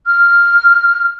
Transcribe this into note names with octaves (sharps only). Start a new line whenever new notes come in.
F6